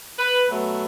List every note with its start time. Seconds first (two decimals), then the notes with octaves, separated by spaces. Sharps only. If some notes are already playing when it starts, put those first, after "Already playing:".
0.19 B4
0.48 B2 F#3 A3 B4